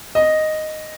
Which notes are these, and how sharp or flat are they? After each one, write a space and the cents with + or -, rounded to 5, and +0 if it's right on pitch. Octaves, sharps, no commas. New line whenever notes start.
D#5 -5